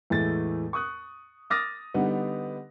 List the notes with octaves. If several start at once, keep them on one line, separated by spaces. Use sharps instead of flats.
E2 A2 G#3 A3 A6
C#6 D#6 F#6
D6 D#6 F6 A6 A#6
D3 G3 B3 D#4